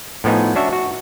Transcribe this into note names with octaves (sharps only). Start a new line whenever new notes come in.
A2 F3 B3 D#4 G#5
C#4 D4 F#4 E5
F#4